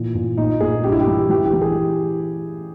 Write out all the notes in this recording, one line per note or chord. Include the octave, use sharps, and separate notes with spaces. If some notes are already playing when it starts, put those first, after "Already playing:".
Already playing: A#2 E3
A#2
A#2 D#4
A#2 G#4
G2 G4
E4
G4
E3
E3 G4
G4
E3
G#4